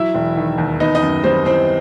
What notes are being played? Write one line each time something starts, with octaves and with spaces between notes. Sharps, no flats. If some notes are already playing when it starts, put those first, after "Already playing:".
Already playing: F#3 E4 E5
E1
D#3
D#2
B3 D#4 D#5
D#4 D#5
F#2
G3 C4 C5
E3 C4 C5